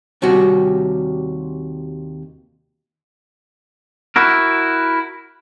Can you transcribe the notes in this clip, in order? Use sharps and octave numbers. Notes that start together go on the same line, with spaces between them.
D#2 C3 G3 C#4 F#4
E4 F#4 A#4